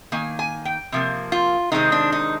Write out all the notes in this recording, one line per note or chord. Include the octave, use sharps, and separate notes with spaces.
D#3 A#3 G#5
G#5
G5
C3 F3 A#3
F4
C3 D#3 G#3 C4 D#4
D4
D#4